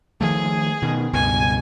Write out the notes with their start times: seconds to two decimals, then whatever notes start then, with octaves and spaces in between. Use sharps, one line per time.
0.21 D#3 F3 A3 G#4
0.82 B2 D#3
1.13 C#2 G2 B2 G#5